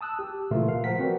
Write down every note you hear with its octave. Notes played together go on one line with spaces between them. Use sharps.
A5 D#6 E6 F#6
G4
A#2 C#3 E3 A3 F4 A#4
F5
F3 A#4 F#5 B6
C4 F4 F#4 B4 D5